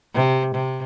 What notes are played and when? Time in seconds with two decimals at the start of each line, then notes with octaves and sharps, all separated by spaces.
0.15 C3
0.55 C3